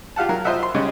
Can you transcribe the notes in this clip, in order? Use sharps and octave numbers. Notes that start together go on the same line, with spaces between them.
F4 G4 F5 F#5 A5
F#3 A#4
F4 C5 D#5 E5 F#5
C6
C#3 G3 G#3 C#4